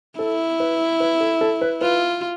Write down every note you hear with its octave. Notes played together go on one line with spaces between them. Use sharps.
E4 A4
B4
B4
A4
A4
B4
F4 B4